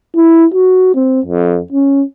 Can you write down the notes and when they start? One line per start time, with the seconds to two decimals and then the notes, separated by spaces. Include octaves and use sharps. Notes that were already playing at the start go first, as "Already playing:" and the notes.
0.15 E4
0.54 F#4
0.95 C4
1.26 F2
1.72 C#4